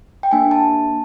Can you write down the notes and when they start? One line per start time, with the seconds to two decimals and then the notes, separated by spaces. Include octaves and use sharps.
0.23 G5
0.31 A#3 D4 G4 G#5
0.51 A5